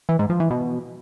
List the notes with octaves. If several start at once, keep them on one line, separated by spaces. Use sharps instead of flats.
E3
G#2
F3
E3
B2